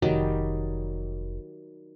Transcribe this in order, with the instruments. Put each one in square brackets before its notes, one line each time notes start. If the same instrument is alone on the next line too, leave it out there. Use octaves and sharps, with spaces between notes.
[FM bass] F1 [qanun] D#3 F#3 G3